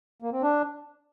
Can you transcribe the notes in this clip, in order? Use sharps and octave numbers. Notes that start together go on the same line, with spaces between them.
A#3
C4
D4